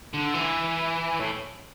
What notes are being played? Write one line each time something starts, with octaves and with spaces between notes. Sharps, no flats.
D3
E3
A2